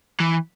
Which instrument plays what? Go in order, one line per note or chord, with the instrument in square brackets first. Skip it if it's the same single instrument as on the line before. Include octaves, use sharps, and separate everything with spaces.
[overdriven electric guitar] E3